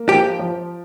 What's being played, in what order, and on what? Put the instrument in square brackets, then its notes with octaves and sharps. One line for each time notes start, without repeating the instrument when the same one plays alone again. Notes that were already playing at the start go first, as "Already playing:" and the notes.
Already playing: [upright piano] A#3
[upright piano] F3 [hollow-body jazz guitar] G4
[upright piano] F3